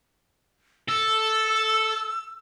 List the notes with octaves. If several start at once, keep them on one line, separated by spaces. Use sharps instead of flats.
A4 E6